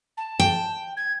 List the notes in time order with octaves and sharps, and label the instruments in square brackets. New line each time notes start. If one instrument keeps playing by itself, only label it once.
[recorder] A5
[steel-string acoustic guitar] G5
[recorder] G#6